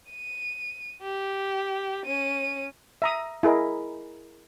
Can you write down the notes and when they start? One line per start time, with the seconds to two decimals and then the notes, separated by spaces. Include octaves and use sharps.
0.10 D#7
1.02 G4
2.06 C#4 D#7
3.02 E5 A#5 D#6
3.43 E4 G#4 A#4 D#5